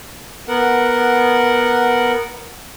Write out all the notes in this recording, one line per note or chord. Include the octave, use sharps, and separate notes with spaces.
B3 A#4 F#5